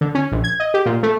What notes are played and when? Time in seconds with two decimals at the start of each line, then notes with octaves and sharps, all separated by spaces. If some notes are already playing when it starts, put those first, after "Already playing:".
0.01 D3
0.15 C#4
0.32 A#1
0.44 G#6
0.60 D#5
0.74 G4
0.86 A#2
1.03 A3